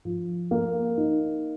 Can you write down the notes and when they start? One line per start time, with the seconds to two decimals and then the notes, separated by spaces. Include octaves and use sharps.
0.05 F3
0.51 A#3
0.97 D#4